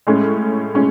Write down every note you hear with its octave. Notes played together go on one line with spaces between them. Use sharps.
A2 G#3 C#4
G#3 C#4